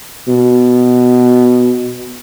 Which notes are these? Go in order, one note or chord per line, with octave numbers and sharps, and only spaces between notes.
B2